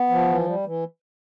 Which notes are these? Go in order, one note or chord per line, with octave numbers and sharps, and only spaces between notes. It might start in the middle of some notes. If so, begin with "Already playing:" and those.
Already playing: B3
F3
E3
G3
E3